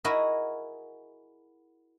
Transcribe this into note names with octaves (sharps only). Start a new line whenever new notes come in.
E4 F#4 G#4 A#4 D#5